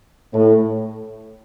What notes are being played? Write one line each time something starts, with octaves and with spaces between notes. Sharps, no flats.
A2